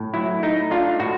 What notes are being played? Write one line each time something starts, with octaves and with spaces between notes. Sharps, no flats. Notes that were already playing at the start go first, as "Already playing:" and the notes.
Already playing: A2
F#3 E4
A3 D#4
D4 F4
A2 F#4